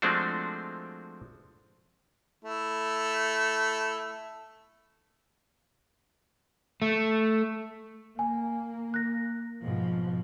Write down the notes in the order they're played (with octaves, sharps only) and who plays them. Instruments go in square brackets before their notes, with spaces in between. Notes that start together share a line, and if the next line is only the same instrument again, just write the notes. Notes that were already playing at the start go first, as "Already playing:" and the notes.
[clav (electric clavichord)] F3 G#3 A3 C4 D4 F#4
[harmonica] A3 E4
[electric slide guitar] A3
[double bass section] A#3 [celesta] G#5
[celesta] F#6 A#6
[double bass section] G#2 B2 F3